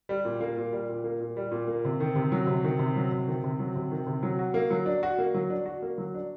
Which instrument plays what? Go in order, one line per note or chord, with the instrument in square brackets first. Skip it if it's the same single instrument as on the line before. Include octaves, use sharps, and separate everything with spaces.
[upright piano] G3
A#2
A#3
A#2
G3
A#2
A#3
A#2
G3
A#2
A#3
C3
D#3
C3
F#3
C3
D#3
C3
F#3
C3
D#3
C3
F#3
C3
D#3
C3
F#3
F#4
A#3
F#3
D4
F#4
A#3
F#3
D4
F#4
A#3
F#3
D4